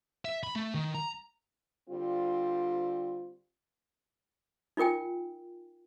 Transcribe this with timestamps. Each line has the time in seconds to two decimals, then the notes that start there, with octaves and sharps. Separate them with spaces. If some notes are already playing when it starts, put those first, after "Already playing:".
0.25 E5
0.43 B5
0.56 A3
0.74 D#3
0.95 A#5
1.89 D3 G3 C4 F4
4.77 D#4 F4 A#4 G5 G#5